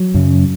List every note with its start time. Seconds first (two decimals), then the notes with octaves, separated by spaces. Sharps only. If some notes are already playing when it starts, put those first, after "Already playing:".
Already playing: F#3
0.14 F#2 C#3